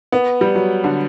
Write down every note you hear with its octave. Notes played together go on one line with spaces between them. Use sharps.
B3
G3
F#3
D3